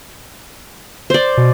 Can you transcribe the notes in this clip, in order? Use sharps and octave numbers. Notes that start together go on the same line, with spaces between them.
C5 D5
B2